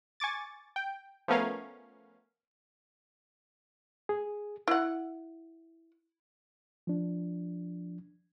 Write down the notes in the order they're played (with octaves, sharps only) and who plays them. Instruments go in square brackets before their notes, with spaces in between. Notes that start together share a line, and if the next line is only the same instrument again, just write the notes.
[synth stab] G#5 C#6 D6 A6
G5
F3 A3 B3 C#4 A#4 F5
[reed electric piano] G#4
[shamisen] E4 F#5
[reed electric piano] F3 D4